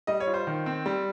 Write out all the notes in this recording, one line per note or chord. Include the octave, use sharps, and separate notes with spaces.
G3 D#5
C#5
F4
C5
D#3
C4
G3